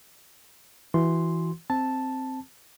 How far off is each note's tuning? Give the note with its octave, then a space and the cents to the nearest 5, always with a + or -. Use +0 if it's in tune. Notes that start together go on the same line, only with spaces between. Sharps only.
E3 +0 F#4 +0 C6 +0
C4 +0 A5 +0